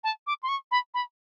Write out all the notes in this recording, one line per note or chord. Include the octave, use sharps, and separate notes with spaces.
A5
D6
C6
C#6
B5
B5